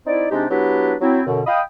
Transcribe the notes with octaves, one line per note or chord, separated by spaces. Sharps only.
C4 D#4 E4 D5
C3 G#3 D4 D#4 G4
F#3 B3 D4 E4 G4 B4
F#3 C4 E4
F#2 B2 D3
D#5 F5 G5 B5 D#6